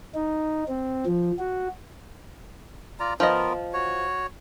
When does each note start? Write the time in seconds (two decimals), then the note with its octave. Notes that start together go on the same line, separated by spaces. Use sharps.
0.14 D#4
0.68 C4
1.06 F3
1.39 F#4
3.00 F4 D5 A#5
3.20 F3 B3 F4 A#4 D#5
3.73 F#4 C#5